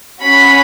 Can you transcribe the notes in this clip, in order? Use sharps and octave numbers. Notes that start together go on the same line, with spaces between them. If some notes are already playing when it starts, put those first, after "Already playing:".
C#4 F#4 B5